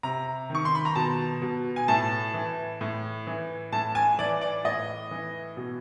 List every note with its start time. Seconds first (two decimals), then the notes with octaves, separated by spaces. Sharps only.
0.03 C3 A#5
0.50 D#3 C#6
0.65 C6
0.75 B5
0.85 A#5
0.95 B2 A5
1.42 B2
1.76 G#5
1.88 A2 A5
2.34 E3
2.81 A2
3.27 E3
3.72 A2 A5
3.95 G#5
4.19 E3 D5
4.41 D5
4.65 A2 D#5
5.11 E3
5.57 B2